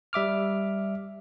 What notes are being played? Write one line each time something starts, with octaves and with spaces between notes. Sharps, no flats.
G3 E5 D6 F6